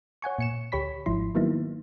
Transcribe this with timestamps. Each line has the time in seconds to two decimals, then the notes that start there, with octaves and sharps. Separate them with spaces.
0.22 C#5 F#5 G#5 C#6
0.39 A#2 C#7 E7
0.72 D2 G4 C#5 B5 B6
1.06 G#1 G#2 F3 E4 C6
1.35 D#3 F#3 A#3 B3 D#4 E4